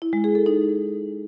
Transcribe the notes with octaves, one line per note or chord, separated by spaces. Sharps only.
E4
G#3
G#4
A4
D#4